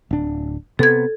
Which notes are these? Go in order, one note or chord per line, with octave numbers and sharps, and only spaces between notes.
D1 D4
C3 B3 A4 G#6